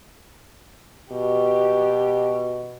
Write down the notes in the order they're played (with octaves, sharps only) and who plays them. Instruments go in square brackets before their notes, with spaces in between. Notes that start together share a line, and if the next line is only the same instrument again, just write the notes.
[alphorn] B2 [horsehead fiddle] G4